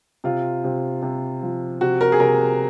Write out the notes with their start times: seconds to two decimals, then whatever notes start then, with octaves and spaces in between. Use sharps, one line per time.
0.24 C3 F4
0.64 C3
1.02 C3
1.43 F3
1.81 C3 F#4
2.01 A#4
2.12 G#4
2.20 C3 A#4